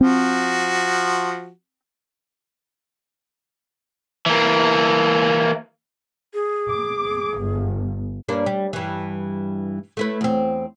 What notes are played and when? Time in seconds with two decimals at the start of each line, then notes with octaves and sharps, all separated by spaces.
0.01 F3 C4 F#4
4.26 E3 A#3
6.34 G#4
6.69 D6
7.40 G1
8.28 G2 A#3 D4
8.46 G3
8.73 G2 E3
9.97 A3 E4 B4
10.21 E2 C4